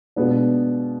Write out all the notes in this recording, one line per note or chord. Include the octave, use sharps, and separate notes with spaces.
B2 G#3 B3 D4 F4